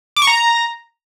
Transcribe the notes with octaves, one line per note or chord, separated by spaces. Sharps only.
D6
C#6
A#5